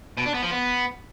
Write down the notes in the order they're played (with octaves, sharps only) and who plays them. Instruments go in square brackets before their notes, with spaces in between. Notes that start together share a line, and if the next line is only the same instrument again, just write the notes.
[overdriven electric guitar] B2
D4
B3
F3
B3